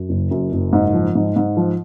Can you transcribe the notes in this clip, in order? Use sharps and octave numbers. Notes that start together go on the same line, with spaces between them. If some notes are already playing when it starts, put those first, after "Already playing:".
Already playing: F#2
F#1
F#2
F#1
G#2
F3
G#2
G#2
F3